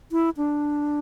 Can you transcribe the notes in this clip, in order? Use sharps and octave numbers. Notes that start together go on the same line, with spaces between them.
E4
D4